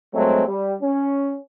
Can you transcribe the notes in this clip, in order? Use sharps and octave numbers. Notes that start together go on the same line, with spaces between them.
G2 F#3 G#3 A3 C4
G3
C#4